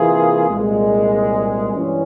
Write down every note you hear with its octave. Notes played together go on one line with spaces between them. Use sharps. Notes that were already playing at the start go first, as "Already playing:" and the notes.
Already playing: C3 E3 A#3 F4 G#4
C2 A#2 G#3
G2 E3 G3 C#4